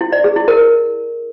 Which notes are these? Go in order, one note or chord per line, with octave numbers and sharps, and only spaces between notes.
E4
D5
G#4
E4
A#4